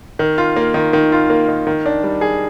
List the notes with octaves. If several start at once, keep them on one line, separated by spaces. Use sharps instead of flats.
D#3
F4
A#3
D#3
D#3
F4
A#3
D#3
D#3
D4
G3
G#4